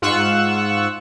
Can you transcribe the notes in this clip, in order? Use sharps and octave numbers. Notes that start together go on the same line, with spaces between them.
G#2 F4 F#5 C#6 E6 F#6